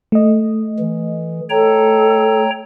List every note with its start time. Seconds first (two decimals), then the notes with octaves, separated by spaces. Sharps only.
0.12 A3 D#5
0.79 E3
1.50 A4 C#5 G5 A#5